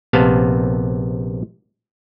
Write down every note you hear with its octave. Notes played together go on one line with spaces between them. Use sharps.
A#1 C3 B3 F5 A5